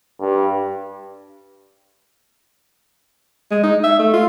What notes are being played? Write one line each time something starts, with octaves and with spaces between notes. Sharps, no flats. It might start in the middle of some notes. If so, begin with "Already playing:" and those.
G2
G#3
D#4
E5
A3
F4